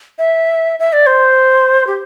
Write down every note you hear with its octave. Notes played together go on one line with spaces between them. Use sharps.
E5
E5
D5
C5
G4